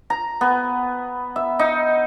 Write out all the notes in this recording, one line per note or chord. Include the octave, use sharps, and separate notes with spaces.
A#5
B3
E5
D#4